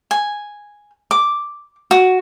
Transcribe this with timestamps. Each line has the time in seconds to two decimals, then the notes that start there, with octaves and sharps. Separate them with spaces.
0.11 G#5
1.11 D6
1.91 F#4